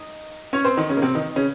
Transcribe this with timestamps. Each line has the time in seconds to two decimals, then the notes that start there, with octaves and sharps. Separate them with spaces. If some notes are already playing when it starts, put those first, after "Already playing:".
Already playing: D#4 D#5
0.53 C#4 C#5
0.65 C4 C5
0.77 D#3 D#4
0.89 C#3 C#4
0.97 A#3
1.02 C3 C4
1.15 D#3 D#4
1.36 C#3 C#4